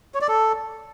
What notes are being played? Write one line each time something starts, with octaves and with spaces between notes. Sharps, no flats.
C#5
D5
A4